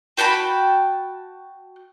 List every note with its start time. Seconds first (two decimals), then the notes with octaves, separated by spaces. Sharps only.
0.17 F#4 G5 A5 B5